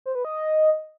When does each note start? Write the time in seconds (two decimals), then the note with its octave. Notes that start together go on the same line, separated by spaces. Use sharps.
0.06 C5
0.15 B4
0.25 D#5